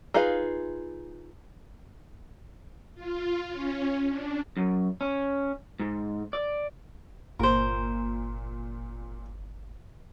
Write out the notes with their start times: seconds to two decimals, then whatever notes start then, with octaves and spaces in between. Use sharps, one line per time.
0.14 D#4 F4 G#4 B4 F5
2.95 F4
3.50 C#4
4.09 D4
4.57 F#2
5.01 C#4
5.79 G#2
6.33 D5
7.39 G1 A#2 A#4 C5